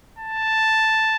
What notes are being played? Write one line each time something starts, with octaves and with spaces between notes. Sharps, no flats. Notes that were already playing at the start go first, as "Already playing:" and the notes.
A5